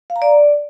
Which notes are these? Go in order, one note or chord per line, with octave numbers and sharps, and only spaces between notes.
F5
A#5
D5